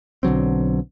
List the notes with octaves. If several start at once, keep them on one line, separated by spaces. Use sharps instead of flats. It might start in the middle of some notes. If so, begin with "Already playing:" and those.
B1 D3 F#3 C4